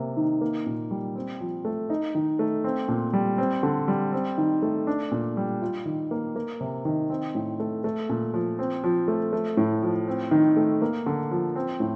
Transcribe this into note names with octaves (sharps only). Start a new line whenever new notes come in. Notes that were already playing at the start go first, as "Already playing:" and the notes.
Already playing: C3 A#3
D#3
A#3
A#2
G3
C4
F3
A3
D#4
D#3
A3
C4
A#2
G3
C4
D3
G3
C4
D#3
A3
D4
A#2
G3
F4
D#3
A#3
A#3
C3
D#3
C4
A2
A3
A3
A#2
F3
C4
F3
A3
A3
A2
F3
C4
D#3
A3
A#3
D3
F3
C4
A2